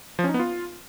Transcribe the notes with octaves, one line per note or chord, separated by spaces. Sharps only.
F3
C#4
D#4
B3
F4